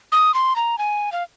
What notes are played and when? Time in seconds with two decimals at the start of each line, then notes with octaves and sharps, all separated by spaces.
0.12 D#6
0.34 C6
0.56 A#5
0.78 G#5
1.12 F5